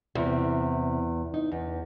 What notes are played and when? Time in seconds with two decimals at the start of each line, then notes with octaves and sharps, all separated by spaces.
0.15 E2 C3
1.34 D#4
1.52 E2